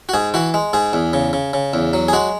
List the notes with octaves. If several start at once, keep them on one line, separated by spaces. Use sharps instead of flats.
F#4
G#2 G#4
E3 F#4
G#3
G#2 G#4
E2
C#3
C#3
C#3
E2
F#3
G#4
G#3 F#4